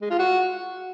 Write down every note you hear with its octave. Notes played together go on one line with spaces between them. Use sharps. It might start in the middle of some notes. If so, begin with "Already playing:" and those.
G#3
F4
F#4